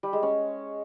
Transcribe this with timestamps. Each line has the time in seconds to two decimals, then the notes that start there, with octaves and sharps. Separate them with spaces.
0.03 G3
0.13 G#3
0.23 C#4